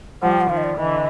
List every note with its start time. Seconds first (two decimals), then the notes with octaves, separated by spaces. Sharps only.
0.21 F3 G3 F#5
0.32 G5
0.41 F#5
0.49 D#3 F3 F5
0.57 D#5
0.64 D5
0.78 D3 E3 D#5